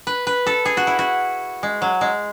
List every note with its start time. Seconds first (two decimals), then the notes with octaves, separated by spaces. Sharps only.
0.07 B4
0.27 B4
0.47 A4
0.65 G#4
0.77 F#4
0.87 E4
0.99 F#4
1.63 G#3
1.82 F#3
2.01 G#3